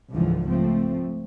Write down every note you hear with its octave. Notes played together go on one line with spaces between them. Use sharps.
C#2 G#2 D3 E3 F3
F3 A3 C4